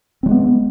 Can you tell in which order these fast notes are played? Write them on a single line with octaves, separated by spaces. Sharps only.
C4 F#3 G#3 B3